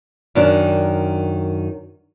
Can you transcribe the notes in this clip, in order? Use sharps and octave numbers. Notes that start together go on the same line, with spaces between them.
F#2 D#3 D4